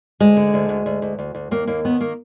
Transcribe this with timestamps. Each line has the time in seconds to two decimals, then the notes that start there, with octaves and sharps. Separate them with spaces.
0.20 D2 G#3
0.37 D3
0.54 D2
0.69 D2
0.86 D2
1.02 D2
1.19 D2
1.35 D2
1.51 D#2 A#3
1.67 D#2 A#3
1.85 D#3 B3
2.01 A#3